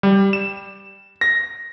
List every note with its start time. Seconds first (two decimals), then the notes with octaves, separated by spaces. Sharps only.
0.03 G3
0.33 E7
1.21 A#6